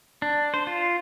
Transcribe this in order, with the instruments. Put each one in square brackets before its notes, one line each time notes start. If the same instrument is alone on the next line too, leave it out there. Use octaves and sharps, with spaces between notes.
[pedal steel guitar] D4
C5
F4